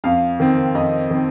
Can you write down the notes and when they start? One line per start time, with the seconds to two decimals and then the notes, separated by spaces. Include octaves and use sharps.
0.04 F2 F5
0.40 D#3 C4
0.75 F2 D#5
1.11 D#3 C4